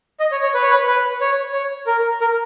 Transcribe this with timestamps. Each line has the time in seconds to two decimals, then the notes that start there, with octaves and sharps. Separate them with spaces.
0.20 D#5
0.32 C#5
0.43 C#5
0.54 B4
0.62 C#5
0.71 B4
0.87 B4
1.21 C#5
1.53 C#5
1.86 A#4
2.21 A#4